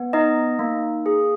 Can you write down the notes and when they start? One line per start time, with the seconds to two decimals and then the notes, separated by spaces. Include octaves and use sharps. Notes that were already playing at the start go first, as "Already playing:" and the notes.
Already playing: B3
0.13 D#4 D#5
0.59 A#3
1.06 G#4